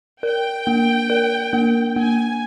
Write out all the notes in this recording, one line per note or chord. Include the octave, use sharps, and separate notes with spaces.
A#4 G5
A#3
A#4
A#3
A#3 G#5